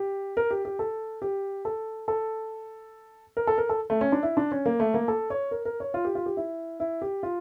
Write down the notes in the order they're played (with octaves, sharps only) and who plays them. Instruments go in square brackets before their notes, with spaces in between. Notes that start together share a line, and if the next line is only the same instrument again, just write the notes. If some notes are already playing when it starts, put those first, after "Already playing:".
Already playing: [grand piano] G4
A#4
G4
G4
A4
G4
A4
A4
A#4
A4
A#4
A4
A3
C#4
D4
E4
D4
C#4
A#3
A3
A#3
A4
C#5
A#4
A#4
C#5
F4
G4
F4
G4
E4
E4
G4
F4